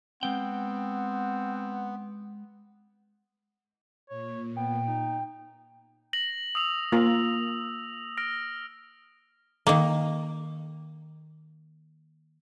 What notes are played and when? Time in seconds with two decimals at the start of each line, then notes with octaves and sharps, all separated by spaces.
0.23 G#3 B3 C4 F#5 G5
4.10 A#2 C#5
4.56 B3 G5
4.87 D#4
6.13 A#6 F#7
6.55 D#6 E6 F7
6.92 A#3 F4
8.18 F6 A#6 D7
9.67 D#3 A#3